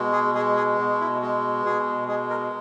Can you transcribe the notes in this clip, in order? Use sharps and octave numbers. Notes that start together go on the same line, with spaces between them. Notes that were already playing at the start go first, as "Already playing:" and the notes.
Already playing: B2 G#3
G#4
G#3 G#4
G#4
B2
E4
G#3
B2 G#4
G#3 G#4
A#4